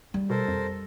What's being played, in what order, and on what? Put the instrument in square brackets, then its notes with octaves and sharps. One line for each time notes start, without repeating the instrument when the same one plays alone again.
[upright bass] G3
[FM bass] B2 [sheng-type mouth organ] A4 A#4 C5
[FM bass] F2